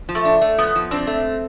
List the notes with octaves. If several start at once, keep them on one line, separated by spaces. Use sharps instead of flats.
F3
A3
D4
A3
F3 B3
F3
C4 D4
A3